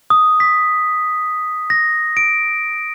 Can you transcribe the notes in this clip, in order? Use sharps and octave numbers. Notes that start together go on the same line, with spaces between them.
D#6
B6
A#6
D7